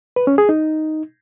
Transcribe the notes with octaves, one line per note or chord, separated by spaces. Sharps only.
B4
C#4
G#4
D#4